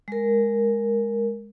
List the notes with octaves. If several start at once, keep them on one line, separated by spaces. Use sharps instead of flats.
G#3 A#4